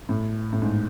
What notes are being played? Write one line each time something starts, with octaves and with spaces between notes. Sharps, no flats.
A2
A2
G#2